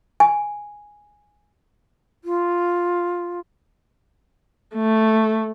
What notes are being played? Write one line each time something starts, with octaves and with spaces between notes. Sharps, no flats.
G#5
F4
A3